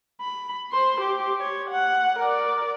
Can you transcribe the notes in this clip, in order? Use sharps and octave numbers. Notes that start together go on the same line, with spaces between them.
B5
C5 C6
G4
C#5
F#5
A#4 D5